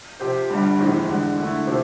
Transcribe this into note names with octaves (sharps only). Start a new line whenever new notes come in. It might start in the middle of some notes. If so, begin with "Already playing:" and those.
C3 F3 C4 G4 C5
G1 G2 D3 G3
F1 E2 C3 E3
E1 E2 D3
D3 A3 E4
C3 F3 C4 E4